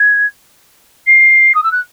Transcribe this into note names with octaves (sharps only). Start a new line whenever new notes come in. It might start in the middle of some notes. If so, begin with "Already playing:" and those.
Already playing: G#6
C7
D#6
E6
F#6